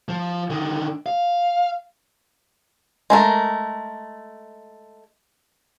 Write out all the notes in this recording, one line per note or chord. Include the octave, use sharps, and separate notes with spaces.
F3
D3 D#3
F5
G#3 A3 A#4